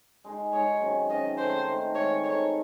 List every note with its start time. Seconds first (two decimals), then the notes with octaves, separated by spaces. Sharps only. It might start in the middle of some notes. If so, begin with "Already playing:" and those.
0.24 G#3 D#4 G#4
0.53 G#3 D#4 G#4 C#5
0.81 C3 D#3 F#3 C#4
1.09 C3 D#3 F#3 C#4 D#5
1.38 D#3 A3 C4 D#4 C5
1.66 D#3 A3 C4 D#4
1.95 D#3 G#3 D#4 A4 C#5
2.24 D#3 G#3 D#4 A4 C#5